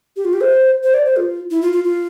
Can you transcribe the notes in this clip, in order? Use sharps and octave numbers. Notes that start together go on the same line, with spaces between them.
G4
F4
G4
C5
C5
D5
C5
F4
E4
F4
F4
F4